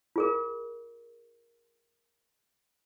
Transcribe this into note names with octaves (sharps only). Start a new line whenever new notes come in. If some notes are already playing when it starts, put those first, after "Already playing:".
F4 G#4 A#4